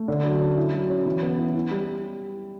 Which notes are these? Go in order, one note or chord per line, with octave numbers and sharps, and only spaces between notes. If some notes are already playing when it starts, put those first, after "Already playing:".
Already playing: A3
D3
F#3
C#4
E4
F#3
C#4
E3
B3
E4
E4
G3